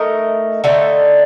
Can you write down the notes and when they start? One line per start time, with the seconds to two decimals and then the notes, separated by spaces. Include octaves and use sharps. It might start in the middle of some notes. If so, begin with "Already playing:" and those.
Already playing: A3 D#4 A#4 D#5
0.64 D3 A3 D#4